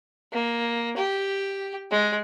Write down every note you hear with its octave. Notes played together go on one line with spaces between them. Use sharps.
A#3
G4
G#3